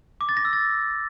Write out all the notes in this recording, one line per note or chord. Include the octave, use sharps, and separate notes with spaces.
D6
A6
A#6
E6
A6